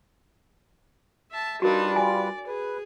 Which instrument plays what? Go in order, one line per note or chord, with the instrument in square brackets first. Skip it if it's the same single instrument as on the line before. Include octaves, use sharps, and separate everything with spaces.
[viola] E5 A5
[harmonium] G3 F4 B4 [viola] D4 D#4 [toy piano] F#4 A#4
[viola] D5 [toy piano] G#5
[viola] G#4 [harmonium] B4